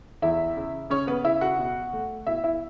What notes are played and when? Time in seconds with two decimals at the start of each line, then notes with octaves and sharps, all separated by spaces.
0.22 E2 E4 E5
0.57 C#3
0.90 C#3 C#4 C#5
1.07 B3 B4
1.24 C#3 E4 E5
1.41 F#4 F#5
1.59 B2
1.93 A3
2.26 B2 E4 E5
2.44 E4 E5